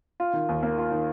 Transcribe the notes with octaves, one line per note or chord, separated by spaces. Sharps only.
F4
D#3
D#2
A#3
F4
D#3